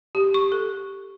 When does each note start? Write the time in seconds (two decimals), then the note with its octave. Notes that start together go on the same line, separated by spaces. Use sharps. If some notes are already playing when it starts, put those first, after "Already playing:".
0.15 G4
0.34 C#6
0.52 A4